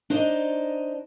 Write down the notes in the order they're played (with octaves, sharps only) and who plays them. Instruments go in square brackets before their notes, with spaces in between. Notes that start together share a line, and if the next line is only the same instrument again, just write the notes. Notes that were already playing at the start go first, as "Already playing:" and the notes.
[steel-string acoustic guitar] D4 D#4 C5 D5 D#5 A#5